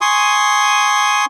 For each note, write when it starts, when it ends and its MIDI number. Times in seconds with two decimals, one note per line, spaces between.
0.01 1.25 80
0.01 1.25 84
0.01 1.25 85
0.01 1.25 87